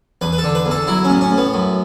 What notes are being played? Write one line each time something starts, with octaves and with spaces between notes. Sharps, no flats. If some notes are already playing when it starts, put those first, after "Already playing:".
E2 B4
B4
A4
D3
B4
E2
A4
F#3 E4
C#4
A2
C#4
A2
B3
F#2